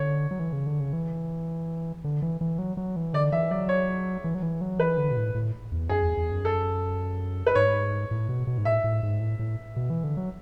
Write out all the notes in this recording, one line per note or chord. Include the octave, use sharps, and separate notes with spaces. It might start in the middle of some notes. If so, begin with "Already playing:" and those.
Already playing: D3 C#5
F#3
E3
C#3
D3
C#3
E3
D3
E3
E3
F#3
F#3
E3
D3 D5
E3 E5
F#3 D5
C#5
E3
F#3
E3
F#3
E3 B4
D3
B2
A2
A2
E2
F#2 G#4
E2
E2
F#2
A4
B4
G#2 C#5
A2
B2
B2
G#2
A2 E5
A2
G#2
A2
A2
B2
E3
D3
F#3